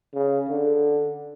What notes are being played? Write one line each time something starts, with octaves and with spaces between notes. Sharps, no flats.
C#3
D3